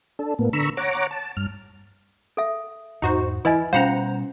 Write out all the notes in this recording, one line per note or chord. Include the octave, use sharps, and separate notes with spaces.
D4 A4
A2 A#3 B3
D3 A#5 B5 C#6 E6
C#5 F#5 A#5 D6
A5
G2 F6
A4 E5
E2 G#2 D#4 F#4 C5
E3 E4 B4 D#5 G#5
B2 G3 C#4 F4 C5 F5 F#5 A#5